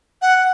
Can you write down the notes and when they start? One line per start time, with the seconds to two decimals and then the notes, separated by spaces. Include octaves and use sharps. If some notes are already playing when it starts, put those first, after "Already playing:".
0.22 F#5